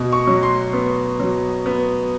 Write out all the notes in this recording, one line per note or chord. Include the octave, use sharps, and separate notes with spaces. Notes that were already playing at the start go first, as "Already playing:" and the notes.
Already playing: B2
C#6
F#3
C6
B3
F#3
B3